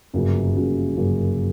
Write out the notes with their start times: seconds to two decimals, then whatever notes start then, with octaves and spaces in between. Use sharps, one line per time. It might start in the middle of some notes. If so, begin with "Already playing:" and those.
0.13 G1 F#2 C#3 F#3 A#3
0.55 G1 F#2 C#3 F#3 A#3
0.95 G1 F#2 C#3 F#3 A#3